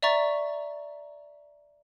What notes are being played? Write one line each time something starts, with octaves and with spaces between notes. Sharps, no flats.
D5 E5 A#5 C#6 A6